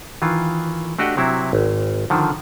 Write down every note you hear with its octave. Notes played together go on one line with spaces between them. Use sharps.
D#3 E3 F4
A3 D4 F#4 G4 D#5 F#5
C3 F#3 C4 E4
G#1
D3 D#3 F3